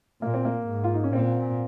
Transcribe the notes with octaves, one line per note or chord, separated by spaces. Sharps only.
A#2 A#3
C4
A#3
G#2
F4
D#4
C#4
A#2 C4